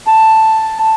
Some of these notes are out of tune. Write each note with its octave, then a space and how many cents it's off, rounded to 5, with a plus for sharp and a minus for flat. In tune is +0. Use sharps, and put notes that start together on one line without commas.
A5 +5